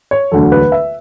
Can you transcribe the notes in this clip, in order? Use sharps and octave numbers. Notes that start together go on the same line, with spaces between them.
C#5
E1 D2 D3 F#3 A4
B4
E5